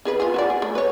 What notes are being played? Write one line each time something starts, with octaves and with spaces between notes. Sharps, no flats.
D#3 G#4 B4
F4 G#4
F#4 B4 D5
G#4
A3
B4 C#5